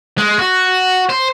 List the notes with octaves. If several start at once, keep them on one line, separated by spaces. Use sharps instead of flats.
G#3
F#4
C5